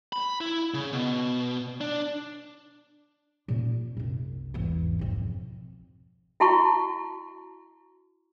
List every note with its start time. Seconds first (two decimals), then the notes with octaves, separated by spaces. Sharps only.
0.13 B5
0.41 E4
0.74 C#3
0.93 B2
1.81 D4
3.48 A#2 C#4
3.97 F#1 C2
4.54 G#1 E2
4.99 B1 F2
6.40 E4 F#4 A5 A#5 C#6